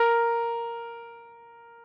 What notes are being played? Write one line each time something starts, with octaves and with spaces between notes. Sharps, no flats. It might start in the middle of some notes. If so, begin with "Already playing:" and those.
Already playing: A#4